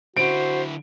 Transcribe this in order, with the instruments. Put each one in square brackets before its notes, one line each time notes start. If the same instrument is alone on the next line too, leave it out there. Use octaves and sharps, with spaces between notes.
[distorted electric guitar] D3 E4 [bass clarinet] F#4 [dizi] C5 [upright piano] D7